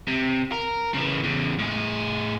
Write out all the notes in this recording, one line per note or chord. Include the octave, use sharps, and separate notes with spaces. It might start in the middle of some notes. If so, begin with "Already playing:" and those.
C3
A#4
C#3 E3
E2 C#3
A2 G#4